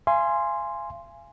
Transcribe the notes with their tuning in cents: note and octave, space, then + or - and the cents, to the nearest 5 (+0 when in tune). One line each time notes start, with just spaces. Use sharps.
F5 -40 G#5 +0 C6 +0